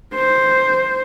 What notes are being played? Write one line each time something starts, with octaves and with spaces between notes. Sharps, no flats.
C5